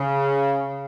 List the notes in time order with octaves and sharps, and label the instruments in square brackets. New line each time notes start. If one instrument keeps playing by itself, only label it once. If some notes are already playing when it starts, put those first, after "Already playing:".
Already playing: [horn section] C#3